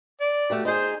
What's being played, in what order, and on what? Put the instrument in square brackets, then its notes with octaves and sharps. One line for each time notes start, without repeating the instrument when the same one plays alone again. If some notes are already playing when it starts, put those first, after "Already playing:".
[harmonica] D5
[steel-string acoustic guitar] A3 F#4 G4
[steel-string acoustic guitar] D#4 G#4 [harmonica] C5